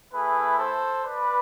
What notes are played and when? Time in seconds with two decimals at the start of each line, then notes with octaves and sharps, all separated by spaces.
0.13 A3 E4 G#4 B4
0.59 A4 C5
1.04 B4 D5